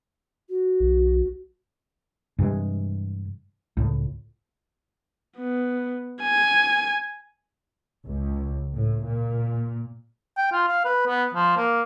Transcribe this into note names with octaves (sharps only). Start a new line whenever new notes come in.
F#4
B1
G2 C3 E3 G#3
C#2 A2
B3
G#5
C#2
A2
A#2
G5
F4
F5
B4
B3
F3
A#3